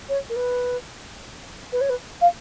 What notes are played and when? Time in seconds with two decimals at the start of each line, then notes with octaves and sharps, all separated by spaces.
0.09 C#5
0.29 A#4
0.36 B4
1.72 B4
1.81 C#5
1.89 B4
2.21 F5